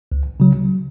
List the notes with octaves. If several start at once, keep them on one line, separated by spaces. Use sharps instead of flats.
C#2
C#3 F#3